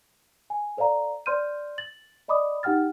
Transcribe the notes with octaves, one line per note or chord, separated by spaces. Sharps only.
G#5
A4 C5 D5 F5 A#5
C5 D5 C6 F6 G6 D#7
A6 F#7
D5 D#5 B5 D6 D#6
D#4 G4 F#5 G5 F6 A6